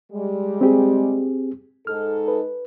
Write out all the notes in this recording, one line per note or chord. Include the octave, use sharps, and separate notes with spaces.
G3 G#3
C4 G4 G#4
G#2 D#4 A4 F6
B4